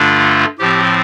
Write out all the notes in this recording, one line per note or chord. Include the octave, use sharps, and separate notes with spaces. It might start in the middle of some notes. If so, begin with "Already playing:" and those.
Already playing: G2 D3 A3 D4 F4
A2 F3 C4 G4